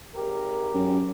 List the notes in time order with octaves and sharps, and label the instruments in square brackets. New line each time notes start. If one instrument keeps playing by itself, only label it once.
[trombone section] G#1 G4 A#4
[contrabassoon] F#2